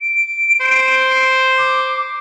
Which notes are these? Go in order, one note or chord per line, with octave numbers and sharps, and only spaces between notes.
D7
C5
D6